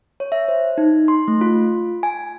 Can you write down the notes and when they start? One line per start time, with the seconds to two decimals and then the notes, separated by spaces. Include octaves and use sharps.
0.20 C#5
0.32 E5
0.48 C5
0.78 D#4
1.08 C6
1.28 A3
1.41 F4
2.03 G#5